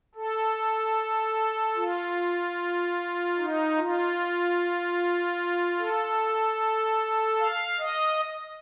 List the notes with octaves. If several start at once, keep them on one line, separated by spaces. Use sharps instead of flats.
A4
F4
D#4
F4
A4
F5
D#5